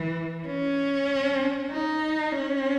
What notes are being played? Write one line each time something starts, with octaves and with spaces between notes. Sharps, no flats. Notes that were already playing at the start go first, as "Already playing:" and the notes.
Already playing: E3
C#4
D#4
C#4